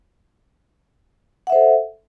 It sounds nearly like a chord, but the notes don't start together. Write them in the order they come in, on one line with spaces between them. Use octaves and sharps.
F#5 E5 C5 A4